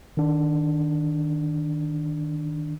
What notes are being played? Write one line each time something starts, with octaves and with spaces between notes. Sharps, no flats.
D#3 D4